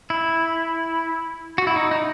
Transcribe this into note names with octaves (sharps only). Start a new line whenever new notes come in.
E4
F#4
E4
D#4
D#4